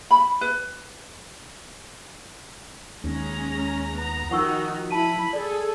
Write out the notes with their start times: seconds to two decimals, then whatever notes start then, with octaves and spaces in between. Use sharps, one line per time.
0.11 B5
0.41 B4
3.04 D#2 G#3 C#4 A#5
3.96 B3 A#5
4.31 D#3 F3 D#4 F#4 F#5 C#6 E6
4.91 E4 A5 B5 D#7
5.33 G#4 A4 D5